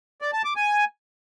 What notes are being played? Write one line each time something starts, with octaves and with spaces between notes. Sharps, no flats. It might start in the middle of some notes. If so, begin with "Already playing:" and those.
D5
A5
D6
G#5